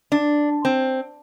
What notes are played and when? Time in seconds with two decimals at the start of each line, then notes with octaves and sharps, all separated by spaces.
0.12 D4
0.65 C4